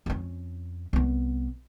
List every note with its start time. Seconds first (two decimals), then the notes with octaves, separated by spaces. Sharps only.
0.06 F2 C#4
0.93 C2 B3